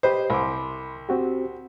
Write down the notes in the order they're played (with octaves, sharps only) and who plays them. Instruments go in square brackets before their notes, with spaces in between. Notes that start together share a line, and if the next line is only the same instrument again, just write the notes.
[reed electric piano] G4 B4 D#5 [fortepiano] C5
[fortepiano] C2 [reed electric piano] B5 C6 D6
[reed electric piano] C4 F#4 G4